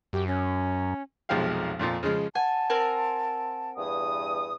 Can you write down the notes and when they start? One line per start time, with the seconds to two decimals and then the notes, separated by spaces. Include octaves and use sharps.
0.13 F#2 G4
0.27 C#4
1.29 F1 B1 F3 G#3 G4 F5
1.79 F2 A#2 F3 F4
2.03 C#3 F3 G#3
2.35 F#5 G#5 A5
2.70 C4 A#4 G#5
3.76 E2 G2 D#6